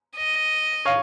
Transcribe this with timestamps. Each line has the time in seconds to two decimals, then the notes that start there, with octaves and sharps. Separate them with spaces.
0.16 D#5
0.85 C#5 F5